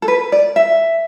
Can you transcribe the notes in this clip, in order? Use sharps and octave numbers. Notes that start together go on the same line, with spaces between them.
A4
B4
D5
E5